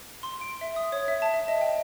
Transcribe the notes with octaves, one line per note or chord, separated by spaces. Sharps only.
C6
D7
E5
D#6
C#5
E5
A5
E5
D#5
G5